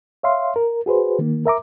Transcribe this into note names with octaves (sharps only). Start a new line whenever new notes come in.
C#5 E5 F5 C6
A#4
F#4 G#4 B4 C5
D#3 A#3
A#4 E5 A#5 D6